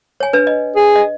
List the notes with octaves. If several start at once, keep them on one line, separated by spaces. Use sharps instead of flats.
C#5 G#5
D4 B4
D#5
G#4
D#5